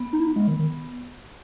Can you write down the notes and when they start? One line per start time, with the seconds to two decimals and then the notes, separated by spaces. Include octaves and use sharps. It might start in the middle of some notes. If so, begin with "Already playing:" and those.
Already playing: B3
0.13 D#4
0.20 E4
0.27 D#4
0.36 G#3
0.48 D#3
0.59 D#3